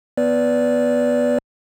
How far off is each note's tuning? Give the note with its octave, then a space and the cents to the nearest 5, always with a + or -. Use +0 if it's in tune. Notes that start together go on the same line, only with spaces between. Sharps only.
B3 +0 B4 +0 D5 -15